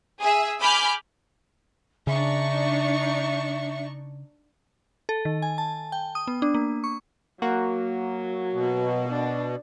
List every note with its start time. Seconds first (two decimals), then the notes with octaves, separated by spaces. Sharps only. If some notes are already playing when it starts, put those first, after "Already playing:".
0.21 G#4 E5
0.61 G#5 B5 D6 F6 G6
2.07 C#3 D4 D#4 E5 C#6
5.09 A4
5.25 D#3
5.42 G#5
5.58 A5
5.92 G5
6.15 D#6
6.27 B3
6.42 D4
6.54 A#3
6.84 C#6
7.42 F#3 A#3 F#4
8.53 B2
9.09 D4